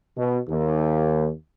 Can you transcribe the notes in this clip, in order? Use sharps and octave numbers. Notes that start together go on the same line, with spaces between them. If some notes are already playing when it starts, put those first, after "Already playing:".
B2
D#2